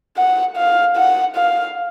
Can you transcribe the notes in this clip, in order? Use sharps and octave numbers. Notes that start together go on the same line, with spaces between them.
F#5
F5
F#5
F5